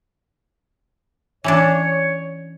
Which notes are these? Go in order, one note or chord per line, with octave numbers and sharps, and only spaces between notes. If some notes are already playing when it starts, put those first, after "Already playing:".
E3 C#4 D4 C#5